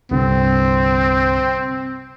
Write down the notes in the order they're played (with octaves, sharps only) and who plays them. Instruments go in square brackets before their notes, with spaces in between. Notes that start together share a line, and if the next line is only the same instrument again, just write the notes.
[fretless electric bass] C2 G2 D3 [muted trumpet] C4